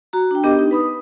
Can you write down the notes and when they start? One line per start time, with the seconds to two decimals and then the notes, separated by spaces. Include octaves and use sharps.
0.13 F#4 A#5
0.31 D4 G5
0.44 B3 D4 G4 A#4 D#5 D6
0.59 D#4
0.71 B4 B5 D#6